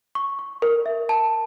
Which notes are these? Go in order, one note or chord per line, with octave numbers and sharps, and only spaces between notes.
C#6
C#6
A#4
E5
A5